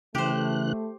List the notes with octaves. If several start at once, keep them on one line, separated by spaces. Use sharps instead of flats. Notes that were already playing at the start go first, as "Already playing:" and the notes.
C#3 E3 A3 G4 C5 F#6